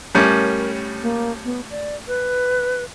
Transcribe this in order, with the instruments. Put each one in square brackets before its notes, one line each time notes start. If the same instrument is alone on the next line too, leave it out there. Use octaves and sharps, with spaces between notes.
[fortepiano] A2 G3 C#4 [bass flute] A#4
[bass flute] A#3
B3
D5
B4